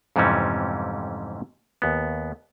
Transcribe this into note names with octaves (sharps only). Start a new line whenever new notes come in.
F2 G#2 C3 E3 G3 C#4
D#2 B3